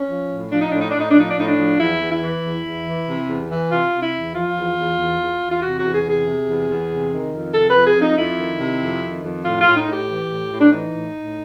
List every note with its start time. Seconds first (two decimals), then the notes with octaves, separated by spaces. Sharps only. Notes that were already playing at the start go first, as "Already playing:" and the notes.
Already playing: C#4
0.09 F3
0.30 A2
0.52 F3 D4
0.62 D#4
0.71 A2 D4
0.80 D#4
0.90 A2 D4
1.00 D#4
1.10 D4
1.16 F3 D#4
1.29 D4
1.37 A2 D#4
1.48 D4
1.58 F3
1.79 E2 E4
2.01 E2
2.12 E4
2.22 E3
2.43 E2
2.65 E2
2.86 E3
3.07 C3
3.28 E2
3.50 E3
3.70 C3 F4
3.92 C3
4.03 E4
4.13 E2
4.34 F3 F4
4.56 E2
4.77 E2
4.98 E2
5.19 E2
5.41 E2
5.52 F4
5.62 C3 F#4
5.78 F#4
5.84 E2
5.94 G#4
6.05 C3 G#4
6.26 C3
6.47 E2
6.69 E2
6.89 C3
7.11 D#3
7.33 F2
7.54 C3 A4
7.70 F2 B4
7.85 G#4
7.96 F2
8.01 D#4
8.18 F2 E4
8.39 D#3
8.60 C3
8.81 F2
9.02 D#3
9.24 F2
9.44 A2 F4
9.60 F4
9.66 A2
9.77 D#4
9.87 A2
9.93 G4
10.08 E3
10.30 A2
10.52 A2
10.61 D4
10.73 E3 D#4
10.93 A2
11.16 A2